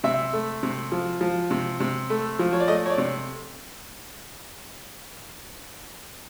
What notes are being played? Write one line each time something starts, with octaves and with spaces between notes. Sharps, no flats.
C3 E5
A3
C3
F3
F3
C3
C3
A3
F3
C#5
D5
A3 D#5
C#5
D5
C3